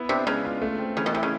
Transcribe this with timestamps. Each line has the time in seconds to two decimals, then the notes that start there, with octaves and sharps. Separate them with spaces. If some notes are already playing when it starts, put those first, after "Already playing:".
Already playing: B3 E4
0.09 C3 D4
0.27 C#3 G#3
0.45 F4
0.62 A3
0.79 C4
0.97 C#3 E3
1.06 B2
1.14 C3 E4
1.23 C#3